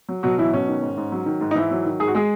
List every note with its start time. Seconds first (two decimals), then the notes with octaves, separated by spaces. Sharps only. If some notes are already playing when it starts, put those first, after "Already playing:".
0.09 F#3
0.23 B2 F#3 F#4
0.39 E3 F#3 E4
0.53 B2 C#4
0.68 D#3
0.82 G#2
0.97 G#2
1.12 F#3
1.26 D#3
1.41 G#2
1.51 D#4
1.55 G#2 E3 E4
1.71 F#3
1.85 D#3
2.00 G#2 G#4
2.08 F#4
2.15 G#3 G#4